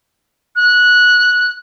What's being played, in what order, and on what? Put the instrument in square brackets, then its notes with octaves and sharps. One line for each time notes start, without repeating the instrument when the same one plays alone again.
[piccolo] F#6